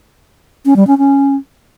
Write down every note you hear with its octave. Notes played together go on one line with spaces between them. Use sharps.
C#4
G3
C#4
C#4